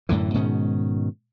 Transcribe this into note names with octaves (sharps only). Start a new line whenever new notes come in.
F#2 A2 D3 E3
G#2 B2 D#3 C#4